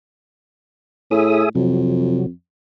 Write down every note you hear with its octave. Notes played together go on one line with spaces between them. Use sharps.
A2 G#4 E5 D#6
F2 C3 F#3